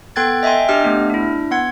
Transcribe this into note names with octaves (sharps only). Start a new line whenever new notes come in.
B3 A4 G5 F#6 G#6 A6
D#5 E5 G5 G#5 C6
D4 G4 D#5 F6
A3 B3 D4
D4 E4
B3 F#5 G#6